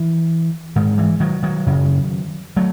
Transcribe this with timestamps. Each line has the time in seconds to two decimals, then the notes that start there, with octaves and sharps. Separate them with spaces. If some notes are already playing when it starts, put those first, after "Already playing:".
Already playing: E3
0.76 G#2 D#3
0.98 E3
1.20 D#3 F#3
1.43 D#3 F#3
1.66 F#2 C#3
2.57 F#3 A3